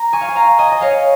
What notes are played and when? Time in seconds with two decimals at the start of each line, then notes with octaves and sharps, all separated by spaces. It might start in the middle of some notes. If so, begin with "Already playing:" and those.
Already playing: A#5
0.13 G#5 C#6
0.21 F5
0.28 G#5
0.35 F5 A#5
0.59 D#5 G#5
0.72 D#5
0.81 C#5 F5